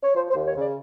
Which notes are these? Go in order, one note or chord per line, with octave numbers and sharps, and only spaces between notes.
C#5
F3 C5
C5
D#2
C#5
C#3 D5